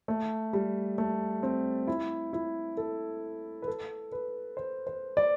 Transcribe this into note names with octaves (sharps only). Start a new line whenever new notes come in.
A3
G3
A3
C4
E4
E4
A4
B4
A4
B4
C5
C5
D5